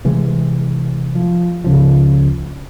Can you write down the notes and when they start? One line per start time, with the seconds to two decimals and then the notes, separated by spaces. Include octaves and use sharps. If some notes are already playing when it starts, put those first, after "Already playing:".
0.05 C3 E3 G#3
1.15 F3
1.64 C#2 C#3 F3